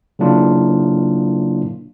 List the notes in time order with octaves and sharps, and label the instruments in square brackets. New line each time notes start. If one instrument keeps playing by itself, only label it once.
[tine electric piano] C#3 F#3 A#3 D4 E4 F4